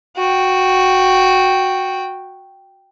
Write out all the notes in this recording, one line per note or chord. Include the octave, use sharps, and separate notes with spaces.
F#4 G5